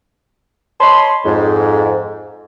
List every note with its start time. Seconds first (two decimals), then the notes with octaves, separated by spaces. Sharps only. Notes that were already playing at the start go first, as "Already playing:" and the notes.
0.81 C#5 D#5 A5 B5 C6
1.25 F2 G#2